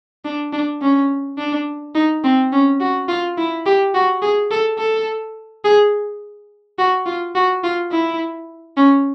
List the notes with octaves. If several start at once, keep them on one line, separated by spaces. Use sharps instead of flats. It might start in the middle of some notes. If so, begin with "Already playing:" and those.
D4
D4
C#4
D4
D#4
C4
C#4
F#4
F4
E4
G4
F#4
G#4
A4
A4
G#4
F#4
F4
F#4
F4
E4
C#4